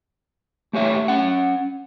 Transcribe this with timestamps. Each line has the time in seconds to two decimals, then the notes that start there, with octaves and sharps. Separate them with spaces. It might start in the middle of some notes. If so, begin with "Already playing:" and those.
0.73 A3 G4 C#5 E5
1.08 C#4 F#5